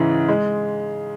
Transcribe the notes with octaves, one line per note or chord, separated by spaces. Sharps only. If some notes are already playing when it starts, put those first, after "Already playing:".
Already playing: G#2 C#3 E3
G#3